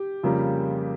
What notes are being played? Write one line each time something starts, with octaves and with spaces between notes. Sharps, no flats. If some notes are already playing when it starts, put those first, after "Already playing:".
Already playing: G4
F2 C#3 G3 A#3